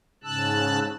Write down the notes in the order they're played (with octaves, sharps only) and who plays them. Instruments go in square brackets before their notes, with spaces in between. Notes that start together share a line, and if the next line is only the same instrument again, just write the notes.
[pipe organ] G#2 C#3 A5 E6 F#6